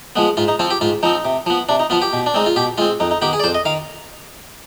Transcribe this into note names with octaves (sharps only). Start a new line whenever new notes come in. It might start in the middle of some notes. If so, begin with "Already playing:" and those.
F3 G#3 B3
G#2 F4
D#4
F3 C4 F4
G4
G#2 F4
F3 C4 D#4
C3
F3 B3
C3 D4
D#4
F3 B3 F4
G4
B2
D4
G#3 C4 D#4
F4
B2 G4
G#3 C4 F4
F2 D#4
D#4
D#3 B3 G4
G#4
D5
F2 C5
D#5
D#3 F5